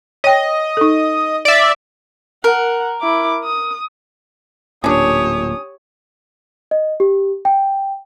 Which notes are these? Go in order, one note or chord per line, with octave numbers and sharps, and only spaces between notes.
C#5 D#5 G5
D#4 A4
D5 E5
A#4 F#5
E4 D6
D#6
D1 A#2 C#4 D4 G4 C#5 D#6
D#5
G4
G5